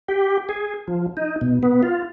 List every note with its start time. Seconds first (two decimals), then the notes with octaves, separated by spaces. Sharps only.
0.08 G4
0.49 G#4
0.88 F3
1.17 D#4
1.41 B2
1.63 B3
1.83 F4